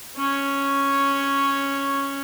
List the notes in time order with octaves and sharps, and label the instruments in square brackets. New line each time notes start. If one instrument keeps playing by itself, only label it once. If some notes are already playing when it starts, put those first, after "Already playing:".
[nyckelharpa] C#4 C#5